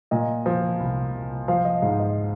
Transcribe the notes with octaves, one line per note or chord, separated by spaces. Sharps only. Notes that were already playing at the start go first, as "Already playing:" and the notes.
A#2 D#5
F3
C2
C2
F3 F5
D#5
G#2 F5
D#5